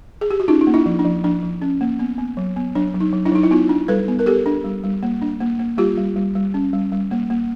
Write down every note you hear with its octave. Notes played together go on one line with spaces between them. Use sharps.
G#4
G4
F#4
C#4 D#4 F4
D#4
A#3
D4 E4
F3
D4
F3
F3 D4
F3
C#4
A#3
B3
B3
F#3
B3
F#3 D4
F#3
D#4
F#3
D4 E4
F#3 D#4
E4
B3 D#4 F4
D4
G3 A4 B4
B3
A#4
B3 G4 A4
D4
G3
G3
A#3
D4
A#3
A#3
G3 F4 G4
G3
G3
G3
C#4
G3
G3
A#3
A#3